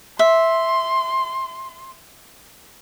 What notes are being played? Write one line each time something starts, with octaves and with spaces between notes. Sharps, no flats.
E5 C6